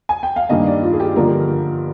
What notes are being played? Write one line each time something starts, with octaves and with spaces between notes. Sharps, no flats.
G#5
G5
F5
G2 D#3 A#3 D4 D#5
D5
F4
G#4
G4
G2 D3 F3 A#3 D4 A#4